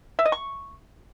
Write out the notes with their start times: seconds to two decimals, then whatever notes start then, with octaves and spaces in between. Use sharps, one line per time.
0.19 E5
0.25 D#5
0.32 C#6